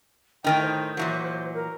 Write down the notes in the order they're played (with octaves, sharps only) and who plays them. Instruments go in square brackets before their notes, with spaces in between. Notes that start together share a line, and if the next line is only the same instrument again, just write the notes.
[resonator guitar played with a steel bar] A2 D#3 D#4 [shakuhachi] G5
[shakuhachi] C5
[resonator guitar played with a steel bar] A#2 E3 F#3
[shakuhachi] A#4